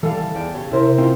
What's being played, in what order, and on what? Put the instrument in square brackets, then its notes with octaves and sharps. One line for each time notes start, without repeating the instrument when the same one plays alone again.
[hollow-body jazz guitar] E3 G3 F5 [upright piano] A4
[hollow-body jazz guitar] E2 D5 G5
C#3 G4 C#5
[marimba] C3 [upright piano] E4 A#4 C5
[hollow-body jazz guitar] C4 D#4 F4